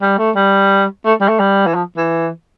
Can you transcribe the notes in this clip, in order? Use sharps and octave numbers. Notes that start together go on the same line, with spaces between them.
G3
A3
G3
A3
G3
A3
G3
E3
F3
E3